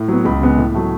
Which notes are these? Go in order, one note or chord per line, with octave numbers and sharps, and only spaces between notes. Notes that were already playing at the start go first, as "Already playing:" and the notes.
Already playing: A2
F#3 B3
C#2 B5
C#3 G#3 B3
A2
F#3 A3